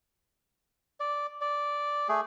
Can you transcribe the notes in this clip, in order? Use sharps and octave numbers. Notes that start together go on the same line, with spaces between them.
D5
D5
A3 G#4